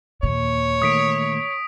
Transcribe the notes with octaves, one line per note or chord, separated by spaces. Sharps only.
D#2 A#2 C#5
D#3 A3 D#6 B6 D7